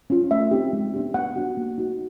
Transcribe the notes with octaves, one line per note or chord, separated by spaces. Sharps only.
C#4 F4
A3 E5
C4 D#4 G4
G#3
B3 D4 G4
B3 F#5
D4 F#4
A#3
D#4 F#4